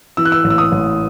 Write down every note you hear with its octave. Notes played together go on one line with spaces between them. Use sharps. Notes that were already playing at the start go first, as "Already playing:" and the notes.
E3 E6
F#6
E6
A1
E6
D#6
A1